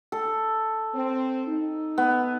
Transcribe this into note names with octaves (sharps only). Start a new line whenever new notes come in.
A4
C4
D#4
B3